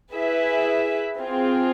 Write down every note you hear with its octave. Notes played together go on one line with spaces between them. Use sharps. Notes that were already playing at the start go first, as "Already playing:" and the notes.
E4 G#4 B4 E5
C4 F4 G#4